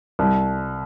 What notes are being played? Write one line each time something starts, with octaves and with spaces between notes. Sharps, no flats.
C2